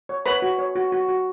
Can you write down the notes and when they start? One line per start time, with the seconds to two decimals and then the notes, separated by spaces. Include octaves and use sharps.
0.09 C#5
0.26 B4 C#5 B5
0.42 F#4
0.59 C#5
0.76 F#4
0.92 F#4
1.09 F#4